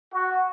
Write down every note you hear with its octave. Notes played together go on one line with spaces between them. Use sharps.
F#4